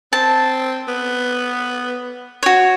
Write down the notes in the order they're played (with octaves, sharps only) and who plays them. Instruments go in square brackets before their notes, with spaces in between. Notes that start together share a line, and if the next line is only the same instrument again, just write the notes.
[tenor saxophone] C4 [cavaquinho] A5
[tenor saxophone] B3
[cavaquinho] F#4 C#5